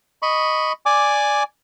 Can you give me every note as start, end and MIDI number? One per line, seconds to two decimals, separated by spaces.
0.22 0.72 75
0.22 0.72 83
0.22 0.72 85
0.86 1.43 74
0.86 1.43 80
0.86 1.43 86